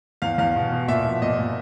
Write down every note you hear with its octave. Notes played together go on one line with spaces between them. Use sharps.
E2 F5
E2 F5
B2
B2
A#2 E5
F3
A#2 D#5
A#2